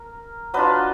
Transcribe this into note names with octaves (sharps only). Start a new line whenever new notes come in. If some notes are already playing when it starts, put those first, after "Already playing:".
Already playing: A#4
F#3 D4 F4 B4 D#5